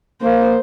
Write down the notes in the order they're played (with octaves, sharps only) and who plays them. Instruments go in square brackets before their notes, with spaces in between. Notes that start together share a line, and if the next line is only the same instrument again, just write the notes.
[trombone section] A#3 [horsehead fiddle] C5